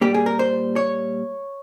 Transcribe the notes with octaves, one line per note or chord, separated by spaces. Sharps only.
A#2 G3 A#3 G4
G#4
A#4
C5
C#5